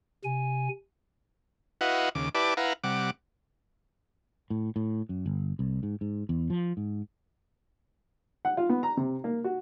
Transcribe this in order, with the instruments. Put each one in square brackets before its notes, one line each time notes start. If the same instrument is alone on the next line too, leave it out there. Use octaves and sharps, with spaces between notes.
[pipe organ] C3 G#5
[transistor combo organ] E4 F#4 B4 D#5 F5 F#5
D#2 C#3 D6
E4 G4 B4 D5 A5 D6
E4 B4 F5 F#5 A#5
C3 G3 F#5 D6
[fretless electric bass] A2
A2
F#2
G1
C2
G#2
G#2
E2
F3
G#2
[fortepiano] F#5
F4
B3
A#5
C3
A#3
F#4